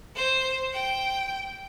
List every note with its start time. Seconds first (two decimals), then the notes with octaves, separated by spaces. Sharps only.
0.15 C5
0.73 G5